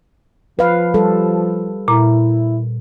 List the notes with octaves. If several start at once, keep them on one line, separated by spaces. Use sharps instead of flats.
F3 B4 F5
G3 A4
A#2 E4 A#5